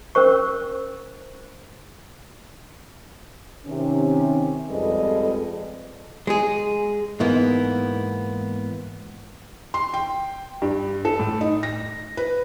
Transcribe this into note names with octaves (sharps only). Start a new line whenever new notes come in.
C#4 A#4 C5 C#6
C3 D#3 C#4
F2 G3 G#3 A4 B4 D#5
G#3 G#4
G#2 E3 A#3 B3
C6
G5
G2
A4
A2
D#4
A#6
B4